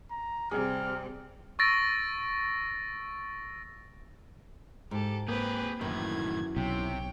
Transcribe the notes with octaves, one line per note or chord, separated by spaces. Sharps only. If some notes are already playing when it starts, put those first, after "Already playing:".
A#5
C3 G3 G#4 F6
C#6 E6 A6 A#6 D7
G#2 G4 A4
A#3 C4 G4 G#4 B4
F#2 A2 D#3 E3 G#6
B1 C3 C#5 G5